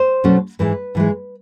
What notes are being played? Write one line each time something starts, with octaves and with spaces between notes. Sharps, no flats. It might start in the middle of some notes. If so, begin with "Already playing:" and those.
Already playing: C5
B2 F#3 A3 C#4
G#2 E3 G#3 B4
G#2 E3 G#3